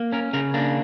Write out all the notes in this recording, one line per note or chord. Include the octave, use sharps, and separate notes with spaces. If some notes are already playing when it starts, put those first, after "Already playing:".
Already playing: A#3
C#4 A#4
C#3 A#4
A#3 D4